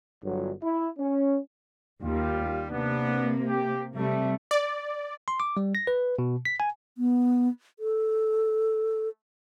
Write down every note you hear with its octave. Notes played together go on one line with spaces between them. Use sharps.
G1 F#3
E4
C#4
D#2 G3 F4
C3 A#3 B3 D4
G4
C3 G3 A3
D5
C6
D6
G3
A#6
B4
B2
B6
G#5
B3
A4